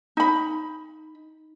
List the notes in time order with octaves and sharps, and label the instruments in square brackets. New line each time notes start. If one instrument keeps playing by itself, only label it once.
[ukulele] D#4 B5